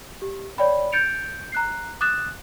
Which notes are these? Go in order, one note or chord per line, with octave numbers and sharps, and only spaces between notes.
G4
C#5 D5 G5 B5
G6 A6 C#7 D7 F7
A#5 F#6 C7
D6 D#6 F#6 A6 E7